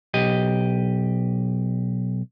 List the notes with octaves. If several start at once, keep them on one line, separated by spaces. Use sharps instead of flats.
B1 G4 D#5